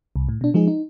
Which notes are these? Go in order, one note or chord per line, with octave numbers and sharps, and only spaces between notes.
C2
A2
B2 D4
F3 G#3 D#4 G#4
D#4